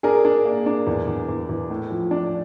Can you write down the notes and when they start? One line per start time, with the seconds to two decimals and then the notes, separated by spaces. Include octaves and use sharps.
0.03 D4 G#4 A#4
0.25 D4
0.45 A#3
0.66 D4
0.87 E2
1.07 E2
1.29 E2
1.49 E2
1.70 A2
1.91 F3
2.11 D4